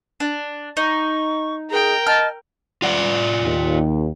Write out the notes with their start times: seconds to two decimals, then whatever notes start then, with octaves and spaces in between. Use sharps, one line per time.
0.20 D4
0.77 D#4 C#6
1.71 G#4 A#4 G5
2.07 D#5 A5 F6
2.82 F4 D5 F#5
3.43 D#2